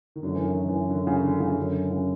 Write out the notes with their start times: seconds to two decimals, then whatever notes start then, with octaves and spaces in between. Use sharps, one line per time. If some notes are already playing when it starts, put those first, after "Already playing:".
0.16 D#3
0.23 F#2 D3
0.35 E3
0.46 D#3
0.68 E3
0.90 D3
1.07 C#3
1.24 D3
1.40 C#3
1.57 F#2 D3
1.91 C#3